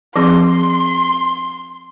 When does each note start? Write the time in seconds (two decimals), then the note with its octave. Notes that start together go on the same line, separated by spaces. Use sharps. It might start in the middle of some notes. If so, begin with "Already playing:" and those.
0.16 F3 C4 G#4 C6